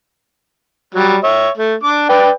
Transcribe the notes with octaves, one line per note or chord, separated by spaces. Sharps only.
F#3 G3
C#5 E5
A3
D4 D6
B4 D5 G5